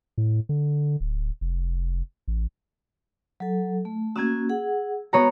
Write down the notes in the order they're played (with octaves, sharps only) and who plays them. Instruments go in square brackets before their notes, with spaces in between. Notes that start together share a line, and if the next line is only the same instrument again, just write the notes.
[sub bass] A2
D3
D1
F1
A1
[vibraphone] F#3 A4
A3
[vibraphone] A#3 C#4 F#4 [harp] E6 G#6
[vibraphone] G#4 F#5
[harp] B3 C#5 A#5 [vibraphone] F#4